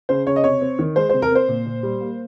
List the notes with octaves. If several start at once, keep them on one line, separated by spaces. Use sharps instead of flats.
C#3 C5
C#3 C#5
D#5
C3 C#5
C4
D#3
G#3 C5
C5
C3
A#4
C4 C5
A#2
A#2
G3
A#3